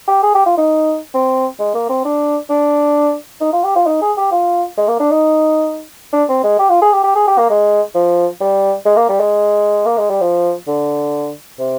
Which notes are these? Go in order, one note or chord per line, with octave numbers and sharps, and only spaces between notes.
G4
G#4
G4
F4
D#4
C4
G#3
A#3
C4
D4
D4
D#4
F4
G4
F4
D#4
G#4
G4
F4
G#3
A#3
D4
D#4
D4
C4
G#3
G4
F4
G#4
G4
G4
G#4
G4
A#3
G#3
F3
G3
G#3
A#3
G3
G#3
A#3
G#3
G3
F3
D3
C3